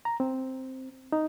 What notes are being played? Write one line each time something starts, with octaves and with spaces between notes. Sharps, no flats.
A#5
C4
D#4